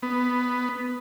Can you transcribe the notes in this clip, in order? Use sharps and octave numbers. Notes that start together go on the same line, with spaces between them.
B3